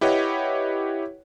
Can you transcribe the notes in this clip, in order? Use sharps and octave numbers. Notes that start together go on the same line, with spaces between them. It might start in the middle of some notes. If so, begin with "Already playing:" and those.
E4 G4 B4 C#5 D#5 F#5